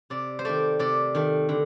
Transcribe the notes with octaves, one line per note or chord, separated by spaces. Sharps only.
C3 D5
C5
D#3 A3 D5
C3 D5
D#3 A3
D3